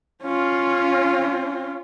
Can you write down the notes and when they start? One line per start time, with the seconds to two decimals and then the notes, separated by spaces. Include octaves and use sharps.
0.23 C#4 F4